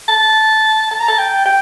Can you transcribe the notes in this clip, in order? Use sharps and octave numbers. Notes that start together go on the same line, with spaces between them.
A5
A5
A#5
A5
G5
G5